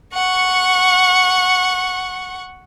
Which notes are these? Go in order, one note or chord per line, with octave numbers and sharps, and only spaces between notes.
F#5 C#6